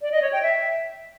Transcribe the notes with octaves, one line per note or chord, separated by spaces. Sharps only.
D5
D#5
C#5
G5
E5